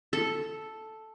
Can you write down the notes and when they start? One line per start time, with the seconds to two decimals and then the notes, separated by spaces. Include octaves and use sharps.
0.13 A4